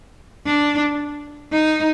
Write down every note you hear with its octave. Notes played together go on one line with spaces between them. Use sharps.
D4
D#4